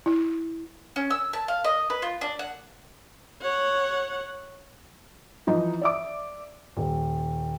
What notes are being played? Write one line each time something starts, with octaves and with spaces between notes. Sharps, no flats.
E4
C#4
E6
A5
F5
D#5
B4
F4
D4
F#5
C#5 F#5
E3 F3 D#4 D#5
D5 E5 D6
D#1